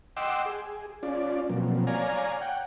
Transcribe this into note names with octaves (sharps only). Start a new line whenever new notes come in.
D#5 F#5 G5 C6 D6 E6
G#4
C#4 F4 D5
B2 F3 F#3 A#3 C4
C#5 D5 F5 G#5 A#5
F#5 G5